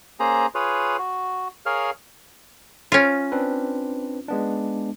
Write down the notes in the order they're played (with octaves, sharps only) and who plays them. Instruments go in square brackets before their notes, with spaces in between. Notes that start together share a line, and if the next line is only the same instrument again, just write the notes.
[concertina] A#3 C#4 G#4 C5 A#5
F4 G#4 B4 C#5
F#4
G#4 A#4 C#5 F5 F6
[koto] C#4 F4
[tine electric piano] C4 D4 B4
G#3 B3 D4